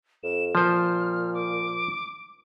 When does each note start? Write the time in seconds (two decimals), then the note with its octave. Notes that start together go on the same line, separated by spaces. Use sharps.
0.23 F2 E7
0.55 A#2 F3 C5 F6
1.34 D6